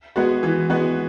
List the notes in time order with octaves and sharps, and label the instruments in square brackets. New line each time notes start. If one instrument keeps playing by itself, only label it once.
[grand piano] G#3 B3 F#4
E3
G#3 B3 F#4